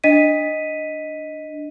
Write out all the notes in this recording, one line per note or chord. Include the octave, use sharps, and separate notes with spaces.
D4 D#5 B6 D#7